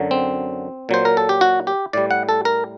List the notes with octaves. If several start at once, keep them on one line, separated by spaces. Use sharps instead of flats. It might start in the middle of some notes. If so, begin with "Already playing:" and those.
Already playing: F#2 D3 F#3
C4
A#2 F#3 C5
A#4
A4
G4
F#4
G4
A2 G3 D5
F#5
A4
A#4